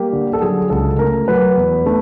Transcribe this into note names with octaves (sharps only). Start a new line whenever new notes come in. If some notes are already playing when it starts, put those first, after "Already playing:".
Already playing: G3 A#3 G4
D3
A4
F#3 G#4
C#2 A4
A3 A#4
F#3 B4
E2
A3